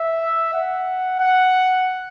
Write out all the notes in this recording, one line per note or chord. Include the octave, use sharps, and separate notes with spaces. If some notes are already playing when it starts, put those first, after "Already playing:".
Already playing: E5
F#5
F#5